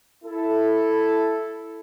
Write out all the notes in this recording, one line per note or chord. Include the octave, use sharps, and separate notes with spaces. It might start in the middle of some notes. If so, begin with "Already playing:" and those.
E4 A4